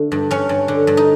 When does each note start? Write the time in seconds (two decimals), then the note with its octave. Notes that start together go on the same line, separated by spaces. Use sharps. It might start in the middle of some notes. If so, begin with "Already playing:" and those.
Already playing: D3 A3
0.12 G2
0.31 G2 C#4
0.49 G2
0.68 D3
0.87 G2
0.97 D#4